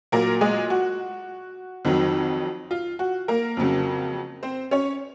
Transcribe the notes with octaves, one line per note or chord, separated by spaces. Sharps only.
A#2 F#3 A#3 A#4
G#3 G#4
F#4
F2 D#3 F#3
F4
F#4
A#3 A#4
F2 C#3 F#3
C4 C5
C#4 C#5